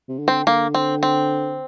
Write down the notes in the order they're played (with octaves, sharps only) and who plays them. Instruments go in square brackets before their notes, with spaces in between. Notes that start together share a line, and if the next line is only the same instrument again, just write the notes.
[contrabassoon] C3
D3
[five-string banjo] C4
[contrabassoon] D3 [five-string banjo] A#3
[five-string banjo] C4
C4